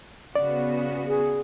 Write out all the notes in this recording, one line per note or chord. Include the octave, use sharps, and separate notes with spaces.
C#3 B3 F#4 D5
G#4